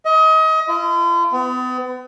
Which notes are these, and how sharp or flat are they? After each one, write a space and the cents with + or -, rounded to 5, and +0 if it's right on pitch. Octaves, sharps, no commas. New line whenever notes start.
D#5 +30
F4 -45
B3 +40